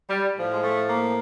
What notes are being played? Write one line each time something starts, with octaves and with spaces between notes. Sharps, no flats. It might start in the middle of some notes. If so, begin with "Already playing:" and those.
G3
A2 F3
G#3
A3
A#3